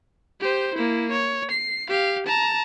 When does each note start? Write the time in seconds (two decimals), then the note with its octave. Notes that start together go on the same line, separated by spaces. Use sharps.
0.40 G4 C5
0.75 A#3 E4
1.11 C#5
1.51 C7
1.89 G4 F5
2.27 A5 A#5